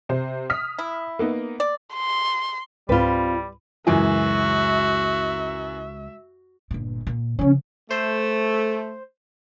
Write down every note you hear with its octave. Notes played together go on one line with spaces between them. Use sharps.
C3 C5
D#6 F6 B6
E4
A#3 B3 D#4
D5
C6
C#2 G#2 G3 C4 F4 B4
C#2 F#2 E3 G#3 F#4 E5 G#5
G1 A#2
A#2
C#3 F3 C#4
A3 C5